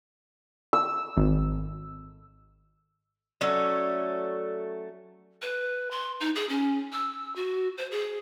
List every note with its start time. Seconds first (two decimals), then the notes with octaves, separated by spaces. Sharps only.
0.73 E6
1.17 G#1
3.41 F#3 A3 C#4 D5 E6
5.42 B4
5.91 C6
6.20 D#4
6.35 G#4
6.49 C#4
6.92 E6
7.36 F#4
7.78 C5
7.91 G#4